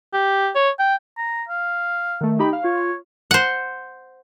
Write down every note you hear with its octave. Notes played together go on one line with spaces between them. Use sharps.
G4
C#5
G5
A#5
F5
D#3 A3
D#4 G4 B5
F5
F4 C#5
C5 F#5